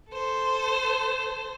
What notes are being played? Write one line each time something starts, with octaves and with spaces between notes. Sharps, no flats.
A4 C5